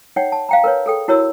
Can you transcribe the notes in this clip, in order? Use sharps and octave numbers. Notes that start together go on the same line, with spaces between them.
D#4 C#5 F#5 G5
A5
F5 G5 A#5
A#4 B4 C#5
G#4 A4 G5
E4 F#4 A#4 C#5 B5 E6